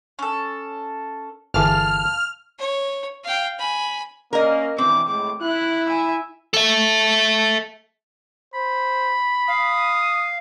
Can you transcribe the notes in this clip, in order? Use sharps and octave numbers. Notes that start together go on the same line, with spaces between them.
C#4 A4
G1 E3 G#4 F5 A5 D6 F6
C#5
F5 G5
G#5 B5
A#3 C#4 A#4 D#5
G2 B2 E3 C4 D6
A2 G#3 D6
E4 F#6
E5 G#5
A4 E5
C5 B5
F5 D#6